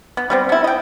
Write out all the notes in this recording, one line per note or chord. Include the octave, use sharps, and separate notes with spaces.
B3
G3 B3 C4
B3 E4
D#5 G5